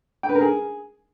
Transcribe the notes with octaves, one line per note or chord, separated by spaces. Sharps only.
G5
B4
A#4
G#4